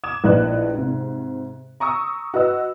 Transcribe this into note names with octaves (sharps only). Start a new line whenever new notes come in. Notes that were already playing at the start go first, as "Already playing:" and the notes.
D6 D#6 G#6 E7
A#1 A2 D#4 B4 F#6
G#2 C3
A#5 C#6 D#6 E6
F#4 B4 D#5 E6